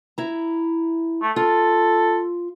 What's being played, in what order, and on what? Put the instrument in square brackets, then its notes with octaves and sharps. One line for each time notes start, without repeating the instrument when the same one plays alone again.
[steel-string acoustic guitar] E4 A#5
[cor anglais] A3
[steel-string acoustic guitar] F4 [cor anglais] A4